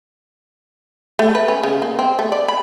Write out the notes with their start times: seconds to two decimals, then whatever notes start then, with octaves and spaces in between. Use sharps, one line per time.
1.19 A3
1.35 B4
1.48 C#4
1.63 C#3
1.82 A#3
1.99 C4
2.19 A3
2.32 D5
2.48 B5